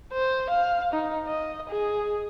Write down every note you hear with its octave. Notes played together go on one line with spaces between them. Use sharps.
C5
F5
D#4
D#5
G#4